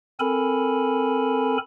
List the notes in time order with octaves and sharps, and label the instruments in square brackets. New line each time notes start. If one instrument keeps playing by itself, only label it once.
[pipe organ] C4 A4 A#4 G#5 B5